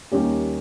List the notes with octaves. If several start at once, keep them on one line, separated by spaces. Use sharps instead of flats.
D#2 D#3 G3 C#4 G4